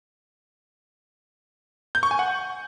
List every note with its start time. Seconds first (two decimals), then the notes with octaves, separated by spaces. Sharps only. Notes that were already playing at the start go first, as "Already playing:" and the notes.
1.95 G6
2.03 C#6
2.11 G#5
2.19 F#5